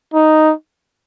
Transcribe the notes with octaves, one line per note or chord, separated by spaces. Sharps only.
D#4